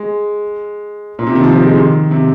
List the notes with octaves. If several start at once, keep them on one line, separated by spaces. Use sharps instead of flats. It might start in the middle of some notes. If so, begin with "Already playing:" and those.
Already playing: G#3
A#2
C3
D#3
F3
F3
G#3
D#3
C3